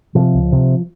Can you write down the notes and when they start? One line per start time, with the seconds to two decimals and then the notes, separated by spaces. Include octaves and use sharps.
0.15 C3 F3
0.34 C#2
0.52 C3